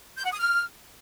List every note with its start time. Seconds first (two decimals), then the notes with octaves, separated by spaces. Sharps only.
0.17 G6
0.24 F#5
0.32 D#6
0.39 F6